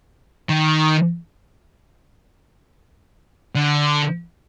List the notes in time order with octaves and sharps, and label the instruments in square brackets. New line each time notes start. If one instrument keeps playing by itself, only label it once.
[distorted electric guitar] D#3
D3